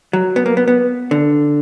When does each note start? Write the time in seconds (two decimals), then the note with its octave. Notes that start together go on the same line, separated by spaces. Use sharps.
0.13 F#3
0.36 B3
0.46 A#3
0.57 B3
0.68 B3
1.11 D3